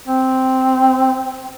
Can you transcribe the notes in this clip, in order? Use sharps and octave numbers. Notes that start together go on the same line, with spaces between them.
C4